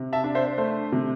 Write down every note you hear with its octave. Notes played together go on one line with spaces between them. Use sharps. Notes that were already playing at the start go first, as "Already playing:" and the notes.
Already playing: C3
E5 A5
D4
C5 E5
A3 C5
C3